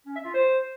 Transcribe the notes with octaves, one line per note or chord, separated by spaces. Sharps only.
C#4
E5
F4
C5